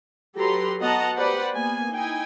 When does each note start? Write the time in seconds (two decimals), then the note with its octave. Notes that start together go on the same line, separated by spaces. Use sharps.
0.37 F#3 G4 A4 B4 A#5 C6
0.80 B3 F#4 D#5 F#5 A5 A#5
1.17 G4 B4 C5 D5 F#5
1.55 A#3 B3 G#5
1.92 D#4 E4 G5 G#5